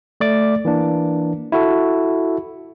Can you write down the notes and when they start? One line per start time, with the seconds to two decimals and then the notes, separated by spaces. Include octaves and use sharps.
0.21 A3 D5 D6
0.65 E3 A#3 D4
1.52 E4 F#4 A4